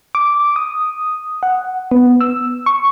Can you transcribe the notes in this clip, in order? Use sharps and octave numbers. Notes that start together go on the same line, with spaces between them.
D6
D#6
F#5
B3
E6
C#6